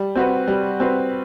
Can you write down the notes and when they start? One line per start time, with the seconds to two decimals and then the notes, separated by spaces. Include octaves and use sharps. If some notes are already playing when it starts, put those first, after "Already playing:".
Already playing: G3
0.15 C4 F#4 B4
0.48 G3
0.80 C4 F#4 B4